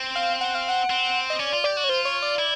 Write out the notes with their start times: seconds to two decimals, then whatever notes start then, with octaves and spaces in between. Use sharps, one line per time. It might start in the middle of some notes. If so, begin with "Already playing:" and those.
Already playing: C4
0.16 F5
0.41 F#5
0.55 F5
0.69 F#5
0.90 C4
1.30 D#5
1.40 C#4 D5
1.52 F4
1.64 G4 D5
1.77 F#4
1.84 C#5
1.89 F4 C5
2.05 C#5
2.22 D5
2.38 E4